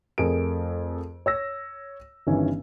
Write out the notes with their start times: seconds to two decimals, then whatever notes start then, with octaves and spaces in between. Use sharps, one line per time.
0.18 F2 A3 G#4 A#4 D7
1.26 C#5 E6 A#6
2.27 G1 G2 D#3 E3 C#4 G#5